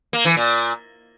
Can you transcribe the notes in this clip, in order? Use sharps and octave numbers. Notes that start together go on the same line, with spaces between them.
A#3
E3
A#2